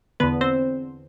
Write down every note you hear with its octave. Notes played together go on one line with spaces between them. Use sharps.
E2 D3 B3 B4
C4 C5